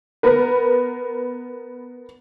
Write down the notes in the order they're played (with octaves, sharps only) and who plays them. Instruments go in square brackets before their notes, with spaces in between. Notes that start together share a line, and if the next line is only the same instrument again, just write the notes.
[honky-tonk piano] B3 A#4 B4